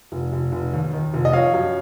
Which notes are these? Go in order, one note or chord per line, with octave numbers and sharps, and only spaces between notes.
F1
F1
F1
D#2
D#3
F1
D#5
F3 C#5 F5
F#2